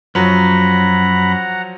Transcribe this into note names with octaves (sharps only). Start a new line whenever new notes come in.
F#2 F3 F#3 F#5 A#5 B5